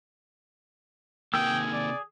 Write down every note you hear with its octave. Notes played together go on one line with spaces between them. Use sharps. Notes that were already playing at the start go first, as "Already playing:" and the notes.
C3 D#3 A#3 G#4 G5 E6
D5